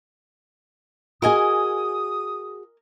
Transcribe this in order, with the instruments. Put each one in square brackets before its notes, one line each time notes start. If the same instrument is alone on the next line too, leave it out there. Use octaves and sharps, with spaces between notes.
[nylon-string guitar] F#4 G#4 [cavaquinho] A#4 D#5 G#5 [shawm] D#6